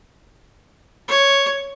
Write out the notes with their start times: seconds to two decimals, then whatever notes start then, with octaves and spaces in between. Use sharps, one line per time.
1.08 C#5